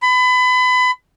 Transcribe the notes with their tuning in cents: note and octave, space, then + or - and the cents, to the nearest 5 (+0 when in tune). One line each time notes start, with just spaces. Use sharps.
B5 +30